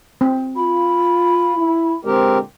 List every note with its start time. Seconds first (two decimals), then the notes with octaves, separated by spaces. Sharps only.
0.21 C4
0.56 F4 B5
1.56 E4
2.05 A#2 D3 G#3 C4 G4 A#4